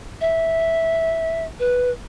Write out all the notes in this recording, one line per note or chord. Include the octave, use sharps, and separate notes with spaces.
E5
B4